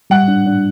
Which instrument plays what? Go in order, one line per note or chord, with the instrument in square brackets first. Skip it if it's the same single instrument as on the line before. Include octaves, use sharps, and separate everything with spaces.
[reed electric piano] G3 [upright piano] F#5
[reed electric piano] D4
D4